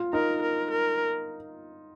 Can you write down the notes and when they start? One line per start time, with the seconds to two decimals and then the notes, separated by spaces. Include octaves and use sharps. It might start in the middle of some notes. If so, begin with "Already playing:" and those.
Already playing: F4
0.13 D#4 A#4
0.42 A#4
0.71 A#4